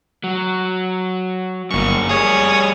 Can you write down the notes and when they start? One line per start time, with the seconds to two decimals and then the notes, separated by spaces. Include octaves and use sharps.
0.24 F#3
1.71 G1 F#2 A#3 C#6
2.09 G3 G#4 C#5 D#6